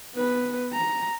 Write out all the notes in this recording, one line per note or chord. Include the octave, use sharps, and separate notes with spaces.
B3 B4
A#5